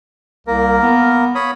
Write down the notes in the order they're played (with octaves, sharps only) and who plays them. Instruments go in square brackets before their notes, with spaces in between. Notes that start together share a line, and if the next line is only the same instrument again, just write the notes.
[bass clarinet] C2 [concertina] A#3 A#4
[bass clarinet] B3
[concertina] C#5 B5 D#6